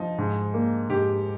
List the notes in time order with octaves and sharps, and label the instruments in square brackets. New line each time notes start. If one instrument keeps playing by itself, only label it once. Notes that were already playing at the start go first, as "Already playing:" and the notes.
Already playing: [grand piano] F3 [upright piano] D#4
[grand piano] G#2
A#3
[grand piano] G#2 [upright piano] G4